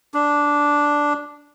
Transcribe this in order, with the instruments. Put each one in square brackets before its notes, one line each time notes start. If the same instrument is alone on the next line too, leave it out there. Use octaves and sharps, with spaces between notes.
[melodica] D4